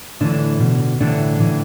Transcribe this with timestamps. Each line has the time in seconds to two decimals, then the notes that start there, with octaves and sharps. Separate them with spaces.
0.21 A2 D3 E3 D4
0.60 B2
1.00 A2 D3 E3 D4
1.40 A2 E3